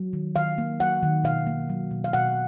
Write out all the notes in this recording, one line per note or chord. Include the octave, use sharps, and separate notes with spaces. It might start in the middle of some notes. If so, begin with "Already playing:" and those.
Already playing: F#3
D#3
D#3 F5
A#3
F#3 F#5
D#3
B2 F5
A#3
F#3
B2
F5
B2 F#5